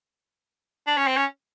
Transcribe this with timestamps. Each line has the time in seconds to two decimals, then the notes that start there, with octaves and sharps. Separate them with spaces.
0.87 D4
0.97 C#4
1.07 C4
1.17 C#4